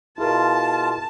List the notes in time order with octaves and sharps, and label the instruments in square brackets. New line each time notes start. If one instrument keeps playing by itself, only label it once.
[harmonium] B2 F4 [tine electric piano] E4 G#4 A#4 [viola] A5